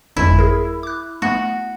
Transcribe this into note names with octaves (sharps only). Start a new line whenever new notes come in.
G1 F2 G#3 E4
G#4 A#4
D6 F#6
A3 B3 F#4